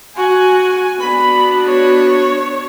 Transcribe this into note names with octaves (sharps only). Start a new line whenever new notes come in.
F#4 G#5
B3 D4 F#4 B5
C#5